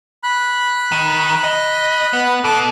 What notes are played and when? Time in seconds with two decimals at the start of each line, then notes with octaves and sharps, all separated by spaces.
0.23 B5 F#6
0.92 D#3
1.44 D#5
2.13 B3
2.44 B2 A4 D6 F#6